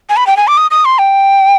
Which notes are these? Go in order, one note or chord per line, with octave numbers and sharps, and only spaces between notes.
G#5
B5
G5
G#5
D6
D#6
D#6
C6
G5